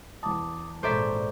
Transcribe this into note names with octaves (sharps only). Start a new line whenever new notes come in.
E2 A5 D6 D#6
G#1 A#2 A4 C5 D5 E5 A#5 C#6